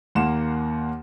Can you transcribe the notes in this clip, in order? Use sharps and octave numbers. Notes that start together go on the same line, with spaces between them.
D#2 A#3 F#5 C6 E7